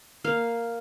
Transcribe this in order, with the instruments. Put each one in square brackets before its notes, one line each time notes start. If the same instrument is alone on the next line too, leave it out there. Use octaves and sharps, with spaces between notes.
[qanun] A#3 F5